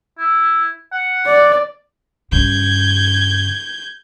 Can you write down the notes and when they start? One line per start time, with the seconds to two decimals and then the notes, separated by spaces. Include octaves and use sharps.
0.19 E4
0.93 F#5
1.26 D5
2.32 G2 C#3 G6 G#6